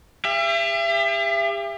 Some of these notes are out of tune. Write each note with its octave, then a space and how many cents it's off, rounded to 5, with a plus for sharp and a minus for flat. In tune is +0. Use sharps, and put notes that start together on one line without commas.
G4 +40 E5 +35